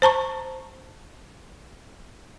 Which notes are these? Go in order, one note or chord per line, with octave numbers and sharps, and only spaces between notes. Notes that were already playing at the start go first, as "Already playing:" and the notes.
C5 A5 A#5 C#6